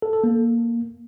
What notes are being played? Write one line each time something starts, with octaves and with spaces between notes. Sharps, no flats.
A4
A4
A#3